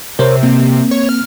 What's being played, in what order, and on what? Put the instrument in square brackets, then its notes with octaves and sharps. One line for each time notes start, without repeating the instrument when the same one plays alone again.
[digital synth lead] C3 [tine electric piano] A#4 C5 C#5
[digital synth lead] C3 [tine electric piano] A#3 C4
[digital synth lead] C#5
F6